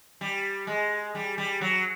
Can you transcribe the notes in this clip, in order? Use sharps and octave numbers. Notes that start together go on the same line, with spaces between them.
G3
G#3
G3
G3
F#3